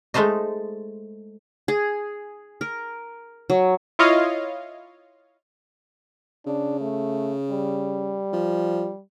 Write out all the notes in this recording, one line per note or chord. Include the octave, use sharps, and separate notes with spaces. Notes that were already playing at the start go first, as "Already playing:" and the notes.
G#3 A3 D#4 C5 D#5
G#4
A#4
F#3
E4 F4 C#5 D#5 F5
C#3 D4
A3
G3
F3